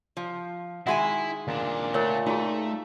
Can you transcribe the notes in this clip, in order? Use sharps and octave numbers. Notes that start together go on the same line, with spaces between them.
F3
D#3 G#3 E4 F#4 E5 F#5 G#5
D#2 A#2 D4
A3 F4 A4 A#4 C#5 F#5
A3 D#4 F4 F#4 G#4